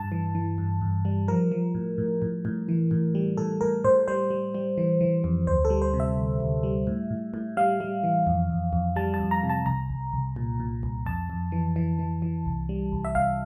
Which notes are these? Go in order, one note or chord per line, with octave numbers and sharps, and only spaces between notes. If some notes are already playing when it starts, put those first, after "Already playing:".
Already playing: G2 A5
E3
E3
G2
G2
G3
F3 A#4
F3
A2
A2
A2
A2
E3
A2
G3
A2 A4
A2 A#4
A2 C5
G3 C5
G3
G3
E3
E3
F2
D2 C5
A4
G3
C5
C3
E5
D2
D2
G3
A2
A2
A2
G3 F5
G3
E3
F2
F2
F2
G3 A5
A5
F2
A#5
C3
A5
C2 A#5
C2
C2
A#2
A#2
C2
F2 A5
F2
E3
E3
E3
E3
C2
G3
C2
E5
C2 F5